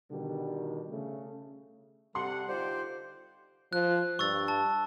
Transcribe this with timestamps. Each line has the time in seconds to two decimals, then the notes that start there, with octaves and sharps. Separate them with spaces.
0.11 B2 D3 D#3 G3
0.90 C#3 A3
2.15 C3 G3 A4 F#5 C6
2.49 D3 D#4 F4 G4 C5 D5
3.73 F3 F#6
4.19 G2 C#6 E6 A6
4.48 A5